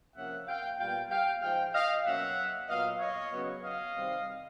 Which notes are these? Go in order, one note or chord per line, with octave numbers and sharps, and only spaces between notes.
C3 F3 A#3 C#4 E5 F#5
F5 G5
A#2 G3 B3 F5 G5
F5 G5
G#2 F3 G#3 F5 G5
D#5 F5
B2 F#3 A#3 C#4 E5 F#5
A#2 F#3 B3 D#5 F5
C#5 D#5
F#2 C#3 F#3 B3
D#5 F5
C3 D#3 G3 C4